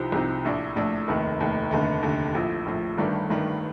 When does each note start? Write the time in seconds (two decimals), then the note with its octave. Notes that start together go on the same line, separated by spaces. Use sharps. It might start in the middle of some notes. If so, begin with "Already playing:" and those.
Already playing: C2 C3 F3 C4 D#4
0.12 C2 C3 F3 C4 D#4
0.45 A#1 A2 A3 D4
0.76 A#1 A2 A3 D4
1.08 F1 D#2 D#3 A3
1.40 F1 D#2 D#3 A3
1.71 F1 D#2 D3 A3
2.03 F1 D#2 D3 A3
2.35 A#1 A2 F3
2.66 A#1 A2 F3
2.98 G1 G2 D#3 A3 D4
3.30 G1 G2 D#3 A3 D4